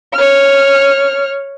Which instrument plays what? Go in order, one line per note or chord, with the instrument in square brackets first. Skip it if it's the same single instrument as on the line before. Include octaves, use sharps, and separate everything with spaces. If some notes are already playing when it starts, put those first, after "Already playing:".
[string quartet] C#5 F6